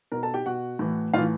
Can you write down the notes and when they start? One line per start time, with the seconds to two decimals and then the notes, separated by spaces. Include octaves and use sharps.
0.12 B2 A#4 A#5
0.23 A4 A5
0.34 G4 G5
0.46 B2 F#4 F#5
0.79 A2 E3
1.13 A2 F4 F5
1.18 E3